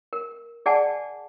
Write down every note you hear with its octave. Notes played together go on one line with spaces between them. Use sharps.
A#4
G#4 D5 F#5 G#5 A5